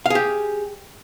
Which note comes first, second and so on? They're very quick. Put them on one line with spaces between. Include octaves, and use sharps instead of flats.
F5 G#4 G4